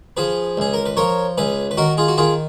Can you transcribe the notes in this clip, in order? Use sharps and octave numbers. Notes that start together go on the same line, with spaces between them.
F3 G#4 B4
C#2 G#4
A#4
B4
F3 A#4 C#5
C#2 G#4 B4
B4
D#3 F#4 A#4
F4 G#4
F#4
D#3 F4 G#4